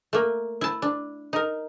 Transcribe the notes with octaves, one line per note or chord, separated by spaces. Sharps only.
A3 A#3
E4 A5
D4
D#4 A#4